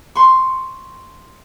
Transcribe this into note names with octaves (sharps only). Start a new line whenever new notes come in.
C6 C#6